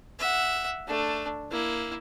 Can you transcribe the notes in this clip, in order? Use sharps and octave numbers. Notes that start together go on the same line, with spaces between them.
E5 F#5
A3 D4
A#3 E4